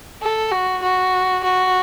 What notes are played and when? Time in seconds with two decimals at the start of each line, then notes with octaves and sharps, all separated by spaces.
0.22 A4
0.52 F#4
0.82 F#4
1.43 F#4